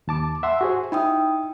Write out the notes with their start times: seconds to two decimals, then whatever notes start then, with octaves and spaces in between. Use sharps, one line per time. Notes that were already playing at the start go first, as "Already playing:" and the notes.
0.07 D#2 A5 D6
0.43 E5 F#5 C6
0.61 F#4 G#4 C5
0.92 D#4 E4 G5 D#6